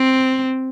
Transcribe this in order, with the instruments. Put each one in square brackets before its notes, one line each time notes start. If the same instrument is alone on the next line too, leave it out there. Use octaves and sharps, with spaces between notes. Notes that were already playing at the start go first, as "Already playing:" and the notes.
Already playing: [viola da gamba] C4